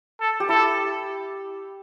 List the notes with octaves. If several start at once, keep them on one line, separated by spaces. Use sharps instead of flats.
A4
G4
E4 A4